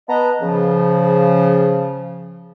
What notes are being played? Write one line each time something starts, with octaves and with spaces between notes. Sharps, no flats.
B3 B4 D#5 A5 A#5
C#3 F3